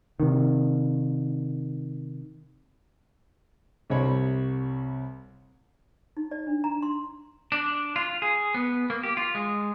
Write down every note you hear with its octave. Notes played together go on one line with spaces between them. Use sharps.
C3 D#3
C2 C3 G3 C4 C#5 B5
D#4
D5
D4
A#5
C6
D4
F4
G#4
B3
A#3
G4
F4
G#3